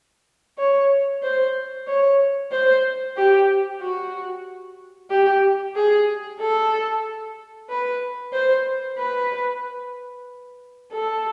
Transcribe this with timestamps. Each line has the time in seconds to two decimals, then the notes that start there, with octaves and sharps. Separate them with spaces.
0.58 C#5
1.23 C5
1.87 C#5
2.51 C5
3.17 G4
3.81 F#4
5.10 G4
5.75 G#4
6.40 A4
7.69 B4
8.33 C5
8.98 B4
10.92 A4